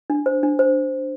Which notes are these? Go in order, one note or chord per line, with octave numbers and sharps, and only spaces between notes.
D4
C5
D4
C5